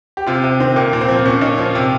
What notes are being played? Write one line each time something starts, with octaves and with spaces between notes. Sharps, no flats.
G4
C3 F4
C3
D#3 C4
A#2 A#3
A#2
C4
F3
C4
A#2 C#4
A#2 D#4
F3 F4
C3